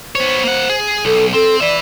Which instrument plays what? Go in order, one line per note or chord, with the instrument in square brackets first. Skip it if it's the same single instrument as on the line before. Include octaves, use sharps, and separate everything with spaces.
[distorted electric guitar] B3 C#5 [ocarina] C5
[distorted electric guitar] A#3 F#5
G#4
[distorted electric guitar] B1 [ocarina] A4
[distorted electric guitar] C4 [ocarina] A4
[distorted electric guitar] B4 E5 [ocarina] D5